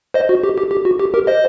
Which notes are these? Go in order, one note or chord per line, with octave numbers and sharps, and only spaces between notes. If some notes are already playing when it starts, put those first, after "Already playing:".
C5 D#5
F#4
G4
G4
G4
F#4
G4
G4 A#4
C5 D#5